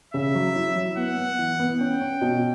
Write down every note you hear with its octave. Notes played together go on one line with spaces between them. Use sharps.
C#3 E5
F#3
E4
F#3
B3 F#5
B3
E3
B3
C#4 G5
C#4
B2